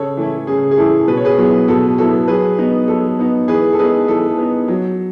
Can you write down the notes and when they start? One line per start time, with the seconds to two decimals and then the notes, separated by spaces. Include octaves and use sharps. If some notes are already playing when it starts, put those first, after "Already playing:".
Already playing: C#3 A4 C#5
0.17 E3 A3 E4
0.47 C#3 G#4
0.71 G#4
0.77 E3 A3 E4 A4
1.08 B2 B4
1.17 C#5
1.25 G#4 B4
1.38 F#3 B3 E4
1.68 B2 A4
1.98 F#3 B3 E4 A4
2.28 F#3 G#4 B4
2.58 B3 D#4
2.88 F#3 A4
3.19 B3 D#4
3.48 E3 G#4 B4
3.72 A4
3.79 B3 D#4 G#4 B4
4.08 E3 A4
4.38 B3 D#4
4.68 F#3